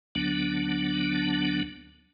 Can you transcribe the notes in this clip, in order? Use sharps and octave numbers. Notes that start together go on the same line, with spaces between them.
D2 D3 F#3 B3 D4